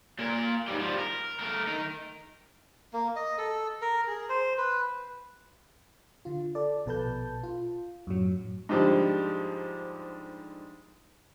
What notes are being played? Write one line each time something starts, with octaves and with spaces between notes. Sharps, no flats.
A#2 A#4
G#2 G3
F3 G3
A#4
A3 A#4
D#4 A#4
A#3
D#5
A4
A#4
G#4
C5
B4
D3 F4
A4 D5
A#1 B2 A4 B4 A5 G6
F4
F#2 A2 F#3
G#2 D3 F3 G3 G#3